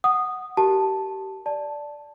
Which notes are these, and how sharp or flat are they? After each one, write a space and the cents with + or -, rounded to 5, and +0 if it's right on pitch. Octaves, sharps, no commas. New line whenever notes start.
F#5 +0 D#6 -15
G4 -25 A#4 +0 A5 +0
D5 +0 A5 +0